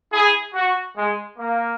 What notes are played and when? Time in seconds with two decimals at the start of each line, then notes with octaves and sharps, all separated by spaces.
0.12 E4 G#4
0.54 F#4
0.96 G#3
1.38 A#3